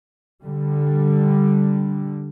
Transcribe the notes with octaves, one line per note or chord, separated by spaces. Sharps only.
D3 G3